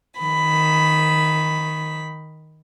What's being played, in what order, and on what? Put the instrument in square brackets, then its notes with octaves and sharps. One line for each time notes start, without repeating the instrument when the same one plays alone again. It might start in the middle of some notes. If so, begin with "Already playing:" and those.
[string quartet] D#3 B5